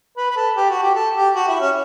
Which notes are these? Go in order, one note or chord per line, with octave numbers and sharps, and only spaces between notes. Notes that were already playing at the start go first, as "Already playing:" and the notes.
B4
B4
A4
G4
F#4
G4
A4
G4
F#4
E4
C#4